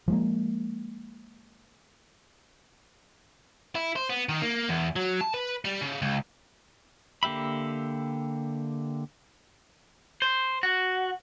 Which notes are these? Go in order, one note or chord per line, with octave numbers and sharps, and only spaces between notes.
F3 G#3 A#3
E4
C5
B3
D#3
A#3
E2
F#3
A5
B4
G3
C#3
C#2
D3 A#3 G4 E5 B5
C5
F#4